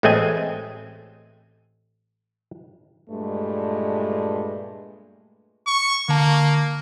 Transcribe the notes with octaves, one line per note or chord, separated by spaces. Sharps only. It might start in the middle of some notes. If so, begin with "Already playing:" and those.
A1 G#3 A3 C4 D#5 G#5
G2 A#2 G#3 A3
C#6
D3 A#3 A5